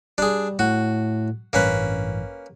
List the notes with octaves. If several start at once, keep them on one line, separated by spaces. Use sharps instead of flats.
G3 D4 G#4
A2 F#4
A1 G2 A#3 C#4 B4